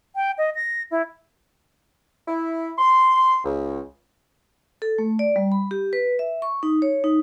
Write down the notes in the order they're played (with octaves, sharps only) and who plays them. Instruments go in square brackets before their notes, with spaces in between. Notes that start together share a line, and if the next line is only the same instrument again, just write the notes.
[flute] G5
D#5
A#6
E4
[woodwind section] E4
C6
C#2
[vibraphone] A4
A3
D5
G3
B5
G4
B4
E5
C#6
D#4
C#5
D#4